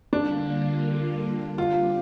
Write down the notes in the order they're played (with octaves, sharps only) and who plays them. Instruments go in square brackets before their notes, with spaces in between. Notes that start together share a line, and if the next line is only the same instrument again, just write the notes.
[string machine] D3 G3 A#3 F4 [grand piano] D4
[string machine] G3 C4 G4 [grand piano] F4